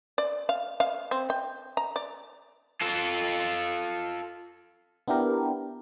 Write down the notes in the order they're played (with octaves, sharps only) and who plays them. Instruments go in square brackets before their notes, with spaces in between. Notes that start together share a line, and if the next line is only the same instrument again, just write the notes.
[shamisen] D5
F5
F5
C4
G5
A#5
D5
[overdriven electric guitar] F4 A4
[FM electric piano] B3 D4 E4 G4 A#4